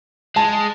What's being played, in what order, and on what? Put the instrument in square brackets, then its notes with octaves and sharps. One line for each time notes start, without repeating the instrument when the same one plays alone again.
[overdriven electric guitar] G#3 [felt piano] A5